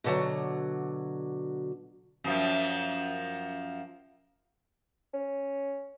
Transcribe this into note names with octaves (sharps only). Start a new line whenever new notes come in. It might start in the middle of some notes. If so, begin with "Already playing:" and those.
B2 D3 F#3
F#2 F3
C#4